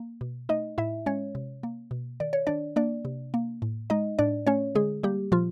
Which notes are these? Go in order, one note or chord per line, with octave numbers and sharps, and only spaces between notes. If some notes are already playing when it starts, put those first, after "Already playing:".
Already playing: A#3
B2
A3 D#4 D#5
A2 E4 E5
G#3 C#4 C#5
C3
A#3
B2
D#3 D5
C#5
D#3 D4 D5
A#3 D4 D5
C3
A#3
A2
G#3 D#4 D#5
A2 D4 D5
A3 C#4 C#5
D3 G#3 G#4
G3 A#3 G4
A#2 F3 F4